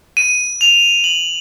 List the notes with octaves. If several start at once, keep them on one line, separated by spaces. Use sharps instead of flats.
D#7
F7
F#7